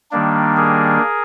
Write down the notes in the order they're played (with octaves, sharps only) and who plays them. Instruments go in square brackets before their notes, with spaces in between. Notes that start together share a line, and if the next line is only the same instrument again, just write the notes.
[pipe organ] D#3 G3 A#3 D4
G#4 A#4